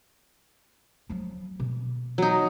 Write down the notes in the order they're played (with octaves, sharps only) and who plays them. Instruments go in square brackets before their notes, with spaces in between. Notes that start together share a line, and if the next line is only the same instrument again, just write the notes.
[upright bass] F3 F#3
B2
[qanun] F#3 D#4